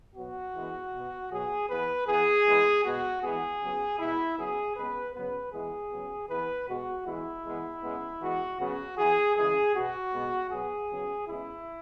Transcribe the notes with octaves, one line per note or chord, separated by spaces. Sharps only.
B2 F#3 B3 F#4
E3 G#3 B3
B2 B3
B2 F#3 B3 G#4
E3 B3 B4
E3 B3 G#4
E3 G#3 B3
B2 G#3 B3 F#4
E3 G#3 B3 G#4
C#3 F#3 B3
B2 G#3 B3 E4
C#3 F#3 B3 G#4
C#3 G#3 B3 B4
C#3 F#3 B3 B4
E3 G#3 B3 G#4
C#3 F#3 B3
E3 B3 B4
B2 G#3 B3 F#4
E3 G#3 B3 E4
E3 G#3 B3
C#3 G#3 B3
E3 G#3 B3 F#4
C#3 F#3 B3 F#4
E3 B3 G#4
C#3 E3 G#3 G#4
B2 B3 F#4
B2 G#3 B3
B2 F#3 B3 G#4
C#3 F#3 B3
C#3 G#3 B3 E4